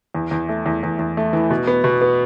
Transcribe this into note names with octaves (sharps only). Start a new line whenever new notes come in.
E2
E2
A3
E2
E2
E2
A3
E3
B2
B3
B2
B3